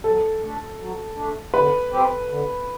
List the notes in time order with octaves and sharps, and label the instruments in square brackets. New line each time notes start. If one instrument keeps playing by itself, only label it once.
[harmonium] F#3 [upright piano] A4
[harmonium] A3 D4
F#3
A3 D4
[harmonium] D3 [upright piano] B4
[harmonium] G3 C4 G4
D3